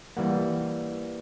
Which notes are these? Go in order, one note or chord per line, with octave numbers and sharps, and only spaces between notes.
E3 G3 A#3 F#5